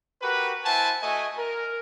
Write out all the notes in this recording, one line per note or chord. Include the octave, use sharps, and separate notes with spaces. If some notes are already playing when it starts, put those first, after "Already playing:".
F#4 G4 A#4 B4
E4 C5 F#5 G#5 A5
A3 F#4 D#5 G#5
A#4